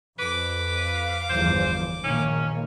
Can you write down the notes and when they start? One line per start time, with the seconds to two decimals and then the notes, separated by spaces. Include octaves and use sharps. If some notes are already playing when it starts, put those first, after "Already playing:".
0.19 F2 B4 D6
0.79 F5
1.29 G1 E2 F3 C5
2.04 A#1 D#3 A#3 C#4 C#5